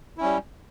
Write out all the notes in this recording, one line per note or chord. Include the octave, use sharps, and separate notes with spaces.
G3 C#4 E4